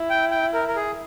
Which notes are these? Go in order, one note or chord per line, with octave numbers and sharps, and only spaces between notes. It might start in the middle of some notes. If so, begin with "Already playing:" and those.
Already playing: E4
G5
G5
A#4
A#4
G#4